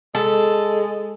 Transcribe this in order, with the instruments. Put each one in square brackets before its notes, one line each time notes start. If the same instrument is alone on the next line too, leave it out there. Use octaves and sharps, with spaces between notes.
[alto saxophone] G#3 [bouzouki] A4